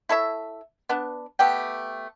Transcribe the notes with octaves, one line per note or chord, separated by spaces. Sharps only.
E4 A4 C#5 E5
B3 D4
A3 B3 G4 G5